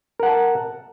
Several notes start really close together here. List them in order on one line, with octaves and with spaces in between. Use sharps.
A#4 F#5 A5